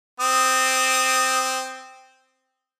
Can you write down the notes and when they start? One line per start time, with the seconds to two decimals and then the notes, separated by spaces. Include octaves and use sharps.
0.20 C4 D#6